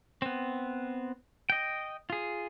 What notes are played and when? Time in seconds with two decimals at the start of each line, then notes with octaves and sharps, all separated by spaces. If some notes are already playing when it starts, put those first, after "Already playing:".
0.22 B3 C4
1.50 D#5 G5
2.10 F4 G#4